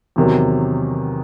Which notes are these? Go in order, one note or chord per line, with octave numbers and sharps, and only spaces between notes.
E2 C3 D#3 F#3